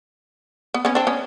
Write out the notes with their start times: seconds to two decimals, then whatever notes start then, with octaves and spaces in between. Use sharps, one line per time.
0.74 B3
0.85 B3 C#4
0.95 C4 D4
1.07 B3 C#4